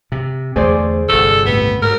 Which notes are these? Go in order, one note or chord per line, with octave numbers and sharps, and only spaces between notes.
C3
E2 D3 A3 G#4 C5 D5
G1 C3 A4
C#2 A2 B3
G#2 A#4